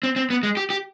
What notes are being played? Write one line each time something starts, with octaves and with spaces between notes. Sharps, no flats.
C4
C4
B3
G#3
G4
G4